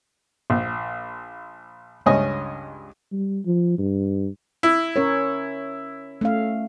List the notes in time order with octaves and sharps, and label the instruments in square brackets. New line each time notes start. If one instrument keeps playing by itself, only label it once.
[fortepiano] A#1
C#2 G2 C#4 D#5 G#5 D#6
[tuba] G3
F3
G2
[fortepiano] E4
[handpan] C#4 A#4 C#5
A3 C#4 F5